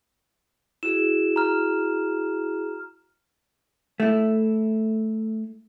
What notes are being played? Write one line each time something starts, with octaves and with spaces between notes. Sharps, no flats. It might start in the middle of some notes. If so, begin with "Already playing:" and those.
E4 F#4 G#4 E7
A#5 F6
A3 E4